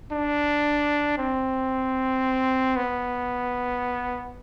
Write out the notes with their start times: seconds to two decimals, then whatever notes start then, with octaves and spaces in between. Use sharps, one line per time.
0.12 D4
1.18 C4
2.76 B3